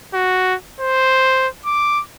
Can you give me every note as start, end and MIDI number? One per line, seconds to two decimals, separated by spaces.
0.14 0.55 66
0.80 1.48 72
1.66 2.01 86